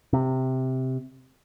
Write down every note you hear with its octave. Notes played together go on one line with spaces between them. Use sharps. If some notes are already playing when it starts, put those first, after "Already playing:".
C3